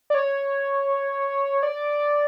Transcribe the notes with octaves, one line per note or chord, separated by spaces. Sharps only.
D5
C#5
D5